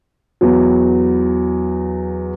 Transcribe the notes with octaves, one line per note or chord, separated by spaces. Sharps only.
E2 F#3